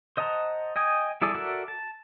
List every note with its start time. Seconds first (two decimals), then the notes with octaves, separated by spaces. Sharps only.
0.17 C5 D#5 F#5 A5 A#5
0.76 D#5 G5 G#5 D#6
1.22 G3 E4 G#4 A4 D5
1.35 F#4 A4 A#4 D5 E5
1.68 A5